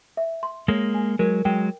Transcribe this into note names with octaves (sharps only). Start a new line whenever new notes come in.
E5
C6
G#3 A#3 C#5
G#5
F#3 G#3 A#4
F#3 G#3 G5